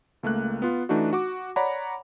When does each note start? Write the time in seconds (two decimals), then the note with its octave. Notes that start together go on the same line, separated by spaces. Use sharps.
0.23 C#2 A3 A#3 F#6
0.62 B3 F4
0.89 E3 A3 D4 D#4 F#4
1.13 F#4 D6
1.56 C#5 D5 F#5 A#5 B5 D6